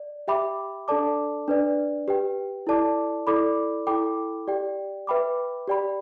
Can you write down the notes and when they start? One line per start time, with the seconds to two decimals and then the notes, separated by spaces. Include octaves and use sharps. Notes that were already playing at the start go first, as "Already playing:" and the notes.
Already playing: D5
0.28 G4 E5 G5 B5 D6
0.88 D4 A4 D5 A5 D6
1.48 D4 B4 D5
2.08 G4 B4 G5
2.67 E4 A4 D5 A5 D6
3.27 E4 A4 D5 B5 D6
3.87 E4 A4 G5 B5 D6
4.48 G4 D5 G5
5.07 B4 E5 G5 B5 D6
5.68 G4 D5 G5 B5